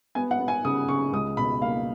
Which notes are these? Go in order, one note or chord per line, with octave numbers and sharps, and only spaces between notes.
B3 G#5
F#5
B3
G#5
C#3 D#6
C#3 C#6
C#2 D#6
B2 B5
A#3 F5